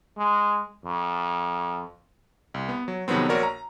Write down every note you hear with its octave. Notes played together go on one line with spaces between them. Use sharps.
G#3
F2
C2
B3
F#3
F2 C3 D#3 F#3 B3 C4
A#1 F#4 A#4 C#5 D5
A#5